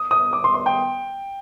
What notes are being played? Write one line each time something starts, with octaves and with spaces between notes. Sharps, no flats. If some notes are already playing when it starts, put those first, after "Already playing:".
Already playing: D#6
D#6
D6
C6
C6
G5